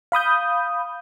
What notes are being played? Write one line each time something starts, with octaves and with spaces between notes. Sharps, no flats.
F5 B5 D#6 G6